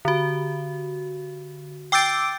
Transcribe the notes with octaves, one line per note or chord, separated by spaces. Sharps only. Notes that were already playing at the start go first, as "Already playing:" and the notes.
D3 F#4
G5 D6 E6 G6 A6 D7